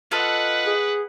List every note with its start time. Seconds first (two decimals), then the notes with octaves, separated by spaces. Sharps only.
0.12 F4 A4 B4 D#5 F#5
0.66 G#4